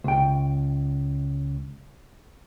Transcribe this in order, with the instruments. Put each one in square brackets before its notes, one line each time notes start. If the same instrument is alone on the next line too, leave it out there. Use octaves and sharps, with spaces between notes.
[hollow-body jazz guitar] C#2 G5